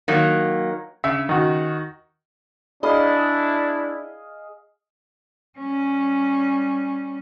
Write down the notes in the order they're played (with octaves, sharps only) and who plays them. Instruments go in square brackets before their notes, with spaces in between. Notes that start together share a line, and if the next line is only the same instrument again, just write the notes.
[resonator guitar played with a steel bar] D#3 F#3 A#3
[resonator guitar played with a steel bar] C#3 [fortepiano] E5
[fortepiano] D#3 F#4
[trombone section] D4 E4 [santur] G#4 D#5 F5 [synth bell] D5 B5
[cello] G3 C#4